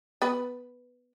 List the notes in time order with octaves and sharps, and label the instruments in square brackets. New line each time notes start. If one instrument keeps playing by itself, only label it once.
[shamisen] B3 B4